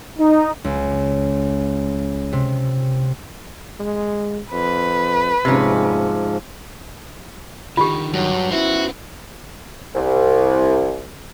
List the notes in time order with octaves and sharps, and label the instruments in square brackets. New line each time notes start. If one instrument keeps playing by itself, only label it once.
[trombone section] D#4
[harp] C#2
C3
[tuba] G#3
[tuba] F2 [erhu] B4
[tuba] D#1 [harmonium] G#2 F3 [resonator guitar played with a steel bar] C3 C#4
[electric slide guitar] D3 D#3 [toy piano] F4 G4
[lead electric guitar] G2 [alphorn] F#3
[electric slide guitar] C#4 B4 C5 [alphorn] E4 [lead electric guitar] F#4
[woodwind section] C2